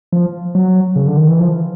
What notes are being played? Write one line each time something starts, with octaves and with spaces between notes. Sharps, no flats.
F3
F#3
C#3
D3
D#3
E3
F3